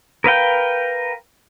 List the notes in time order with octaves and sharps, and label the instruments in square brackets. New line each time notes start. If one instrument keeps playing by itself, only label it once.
[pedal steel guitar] A#4 B4 F5 G5